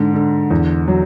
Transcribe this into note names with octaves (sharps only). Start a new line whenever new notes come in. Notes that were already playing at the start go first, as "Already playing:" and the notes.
Already playing: G#2 D3
D3
E2
F#3